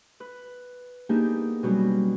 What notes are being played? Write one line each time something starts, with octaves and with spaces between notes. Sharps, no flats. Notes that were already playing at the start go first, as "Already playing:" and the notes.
B4
A#3 B3 D4 D#4 G4 G#4
B2 F#3 G3 C#4